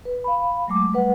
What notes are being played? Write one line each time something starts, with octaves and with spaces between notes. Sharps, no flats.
B4
F5 B5
F#3 G#3 A3 D6
G3 A3 B4 F#5